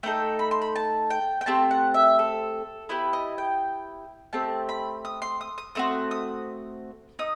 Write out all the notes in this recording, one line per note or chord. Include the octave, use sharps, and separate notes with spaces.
A3 D#4 A4 G5
B5
C6
B5
A5
G5
G5
A3 C4 G4 A5
F#5
E5
A4
B3 E4 G4 B4
D#5
G5
A3 C4 G4 A5
B5
D#6
C6
D#6
D#6
A3 C4 F#4 D#6
D#6
D#4 D#6